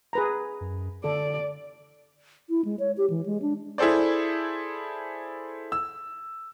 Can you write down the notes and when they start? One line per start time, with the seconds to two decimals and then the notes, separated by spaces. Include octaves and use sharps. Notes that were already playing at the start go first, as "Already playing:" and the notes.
0.13 G#4 B4 A#5
0.61 F#2
1.04 D3 A4 D5
2.50 E4
2.65 G#3
2.79 C#5
2.97 G4
3.10 E3
3.26 G#3
3.42 D4
3.78 E4 G#4 A4 C5 D5
5.72 E6